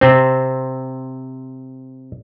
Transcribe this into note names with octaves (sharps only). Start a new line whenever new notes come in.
C3 C4